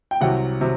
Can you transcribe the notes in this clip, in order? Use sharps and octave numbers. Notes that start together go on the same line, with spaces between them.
G5
C2 C3 F#3 F#5
C3 F#3